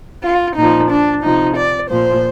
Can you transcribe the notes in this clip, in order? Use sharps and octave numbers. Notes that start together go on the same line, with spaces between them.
F4
A#2 F3 D#4
D4
C3 F3 D#4
D5
A#2 F3 C5